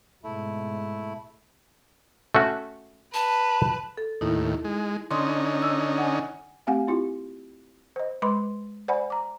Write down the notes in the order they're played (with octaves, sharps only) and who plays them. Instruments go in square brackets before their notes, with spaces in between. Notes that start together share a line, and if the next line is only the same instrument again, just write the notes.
[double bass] G#2 B2 [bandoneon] A3 E4
[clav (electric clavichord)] A3 C#4 F#4
[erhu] B4 [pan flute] A5
[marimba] A4
[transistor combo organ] D#2 A2 [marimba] D#4 E4
[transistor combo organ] G#3
[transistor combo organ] D3 C#4 D#4 [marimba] C6 D#6
[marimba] E6
F#5 G#5
[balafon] A3 C4 G4 F5 F#5 G#5
C4 E4 F4 G4
C5 D#5
G#3 B4 B5 C6 D6
C5 D5 F#5 G#5 B5
A#5 D6